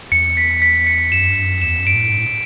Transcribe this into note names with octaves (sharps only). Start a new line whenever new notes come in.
E2 C#7
B6
B6
C#7
F#2 E7
G2
F#2
E2 E7
F#2
D7
A2
G2
A2